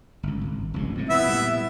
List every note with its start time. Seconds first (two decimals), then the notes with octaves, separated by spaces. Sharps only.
0.23 G1 C#2
0.41 G#1
0.74 F1 C#2 G2
0.95 F2 G#2 C3
1.10 B3 E4 E5
1.26 A#2 G3